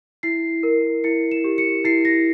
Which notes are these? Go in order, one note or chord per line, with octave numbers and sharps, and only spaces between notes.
E4 C7
A#4
E4 C#7
E7
G4
C#7
E4 C7
A#6